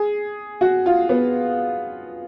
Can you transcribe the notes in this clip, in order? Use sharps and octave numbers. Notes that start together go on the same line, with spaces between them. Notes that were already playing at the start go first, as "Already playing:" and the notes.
Already playing: G#4
F#4
F4
B3